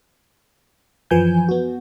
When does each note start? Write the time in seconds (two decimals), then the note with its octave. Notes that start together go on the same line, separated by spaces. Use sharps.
1.11 F#2 E3 F3 B4 G#5 G6
1.49 B3 F#4